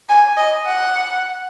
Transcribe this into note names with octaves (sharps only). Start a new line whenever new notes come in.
G#5
D#5
F#5